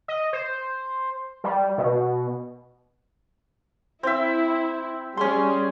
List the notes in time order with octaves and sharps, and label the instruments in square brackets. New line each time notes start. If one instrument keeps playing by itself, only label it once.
[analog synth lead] D#5
C5
G3
B2
[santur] C4 E5 [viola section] E4
[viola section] G3 G#4 [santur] C#4 C6